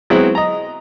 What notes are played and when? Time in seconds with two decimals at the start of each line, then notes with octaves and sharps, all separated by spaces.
0.10 F#3 G#3 B3 C4 E4 G#4
0.35 D#5 A#5